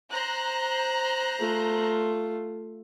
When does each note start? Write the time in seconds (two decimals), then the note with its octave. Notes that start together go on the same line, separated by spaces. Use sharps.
0.11 C5 A#5 F#6
1.39 A3 F4